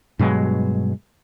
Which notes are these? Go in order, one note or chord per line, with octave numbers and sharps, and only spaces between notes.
G2 B2 F#3 G#3